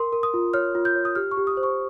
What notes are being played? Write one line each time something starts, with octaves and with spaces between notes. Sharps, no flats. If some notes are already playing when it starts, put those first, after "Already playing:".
Already playing: A#4 C6
A#4
D#6
F4
C#5 F6
F4
G6
C#5
D#6
G4 F6
C#6
G4
D#6
C5
C#6